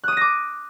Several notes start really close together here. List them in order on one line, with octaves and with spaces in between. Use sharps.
F#6 D#6 D#7 A#6 D6